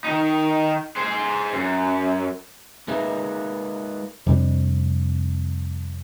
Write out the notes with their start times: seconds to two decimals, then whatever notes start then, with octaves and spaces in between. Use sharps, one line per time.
0.04 D#3 D#4
0.96 G#4 C5
1.53 F#2
2.88 G#3 D#4 A#4 B4 E5 F5
4.26 F2 C3 G3 D4